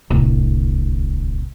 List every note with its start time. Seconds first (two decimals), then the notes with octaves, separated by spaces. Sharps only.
0.10 D1 C2